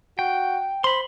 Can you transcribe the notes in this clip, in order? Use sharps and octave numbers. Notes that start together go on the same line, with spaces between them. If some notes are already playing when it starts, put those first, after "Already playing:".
F#4 G5
C5 B5 C6